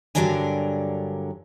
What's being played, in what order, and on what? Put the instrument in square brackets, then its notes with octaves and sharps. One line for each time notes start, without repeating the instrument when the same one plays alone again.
[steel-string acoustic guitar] G2 D3 F#3 D4 A#4 G#5